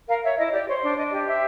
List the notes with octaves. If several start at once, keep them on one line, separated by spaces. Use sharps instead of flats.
A#4 F5
C#5 E5
E4 D#5
G4 D5
C5 C#5
D4
D4 D#5
G4 D#5
C5 E5